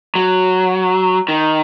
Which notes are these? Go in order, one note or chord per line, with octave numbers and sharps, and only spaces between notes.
F#3
D#3